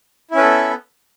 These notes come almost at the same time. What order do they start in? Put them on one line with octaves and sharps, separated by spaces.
E4 C#4 B4 A4 B3